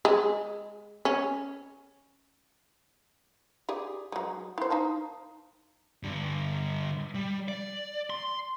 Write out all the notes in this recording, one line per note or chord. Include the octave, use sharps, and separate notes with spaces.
G#3
C#4
G4 G#4 D5
F#3 G#3
E4 C5
D#4 F5 A5
G2 D3
G3
D5
C6